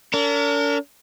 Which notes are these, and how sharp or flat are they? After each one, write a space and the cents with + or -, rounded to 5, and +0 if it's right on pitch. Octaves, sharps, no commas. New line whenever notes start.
D4 -45 A#4 -35